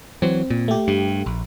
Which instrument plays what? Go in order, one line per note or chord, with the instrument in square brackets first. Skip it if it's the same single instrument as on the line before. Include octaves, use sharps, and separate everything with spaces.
[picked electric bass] E3 F#3 [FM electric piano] C4
[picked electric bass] A#2
[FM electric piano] A3 G4
[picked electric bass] G2
A#1